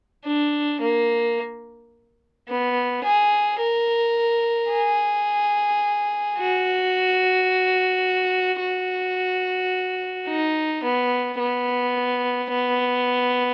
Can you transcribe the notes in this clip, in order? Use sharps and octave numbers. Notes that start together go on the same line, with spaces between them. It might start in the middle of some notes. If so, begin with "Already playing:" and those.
D4
A#3
B3
G#4
A#4
G#4
F#4
F#4
D#4
B3
B3
B3